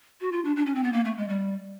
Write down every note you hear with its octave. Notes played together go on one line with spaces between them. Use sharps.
F#4
F4
D4
D4
C#4
C4
B3
A#3
A3
G#3
G3